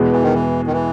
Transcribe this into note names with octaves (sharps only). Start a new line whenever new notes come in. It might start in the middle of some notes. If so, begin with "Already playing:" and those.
Already playing: E2 B2 G#3 B3
E3
D#3
E3
D#3
E3